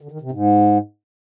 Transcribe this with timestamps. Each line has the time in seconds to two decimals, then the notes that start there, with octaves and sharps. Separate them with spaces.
0.01 D3
0.11 D#3
0.21 C3
0.31 G#2